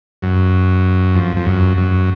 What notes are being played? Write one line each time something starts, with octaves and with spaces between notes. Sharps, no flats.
F#2
F2
F2
F#2
F#2